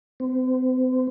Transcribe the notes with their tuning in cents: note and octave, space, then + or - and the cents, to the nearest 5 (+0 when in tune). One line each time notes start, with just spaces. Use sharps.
C4 -40